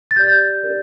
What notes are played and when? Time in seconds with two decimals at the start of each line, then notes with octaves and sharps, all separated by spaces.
0.11 A6
0.16 G4 D5 G6
0.63 D4 G4 A#4 D5